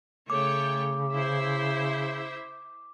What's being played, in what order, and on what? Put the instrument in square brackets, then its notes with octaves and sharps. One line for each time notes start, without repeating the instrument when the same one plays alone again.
[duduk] C#3 [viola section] A3 C#5 G5 [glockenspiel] D6
[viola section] E4 C5 E5